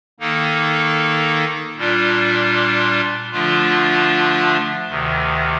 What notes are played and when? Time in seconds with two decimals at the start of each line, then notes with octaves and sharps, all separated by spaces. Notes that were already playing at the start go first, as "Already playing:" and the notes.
0.20 D#3 A#3 D#4 A4
1.76 A#2 G3 D4 F4
3.32 D3 F3 A3 D4 F4
4.89 D2 C3 D#3